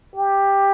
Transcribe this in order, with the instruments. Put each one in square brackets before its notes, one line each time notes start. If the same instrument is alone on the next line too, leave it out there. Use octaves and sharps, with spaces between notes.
[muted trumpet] G4